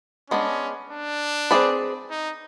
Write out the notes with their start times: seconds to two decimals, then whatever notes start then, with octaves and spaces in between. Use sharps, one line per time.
0.30 G#3 B3 C#4 D4
0.91 D4
1.51 C4 E4 G#4 B4 D5
2.10 D#4